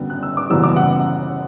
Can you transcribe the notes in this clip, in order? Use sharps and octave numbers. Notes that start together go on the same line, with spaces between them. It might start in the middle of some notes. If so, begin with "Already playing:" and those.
Already playing: F#2 D3 G3 B3
F#6
E6
D6
F#1 F#2 E3 G3 B3 E6
D6
F#5